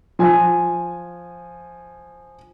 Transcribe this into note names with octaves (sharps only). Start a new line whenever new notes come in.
F3 G#5